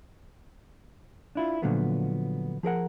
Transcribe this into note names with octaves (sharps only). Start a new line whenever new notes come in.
D4 E4 F4
A#2 D3 F3 F#3 A3 B3
F3 G#4 A#4 F#5